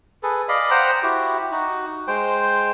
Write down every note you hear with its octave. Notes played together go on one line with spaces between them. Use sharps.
G#4 A4 B4
D5 D#5 F5 B5
C5 F#5 G5 A#5
E4 F#4 G4
D#4 F#4
G#3 C5 G5